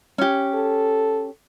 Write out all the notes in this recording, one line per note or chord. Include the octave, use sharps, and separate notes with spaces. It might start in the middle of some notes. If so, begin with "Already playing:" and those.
C#4 G4
A4